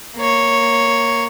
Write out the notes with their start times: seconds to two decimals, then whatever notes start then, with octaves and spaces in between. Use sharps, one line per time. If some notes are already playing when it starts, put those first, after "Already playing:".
0.16 A#3 C#5